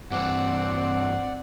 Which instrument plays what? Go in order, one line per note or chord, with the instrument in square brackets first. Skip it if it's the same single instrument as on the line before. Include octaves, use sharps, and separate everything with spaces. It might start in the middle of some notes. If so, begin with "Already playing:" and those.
[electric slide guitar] G2 E3 [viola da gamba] C4 [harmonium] D5 F#5